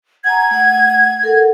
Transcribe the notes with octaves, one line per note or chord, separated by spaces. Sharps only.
F#5 G#5 A#5 G#6
A3 F#5
A4 A#4 F#5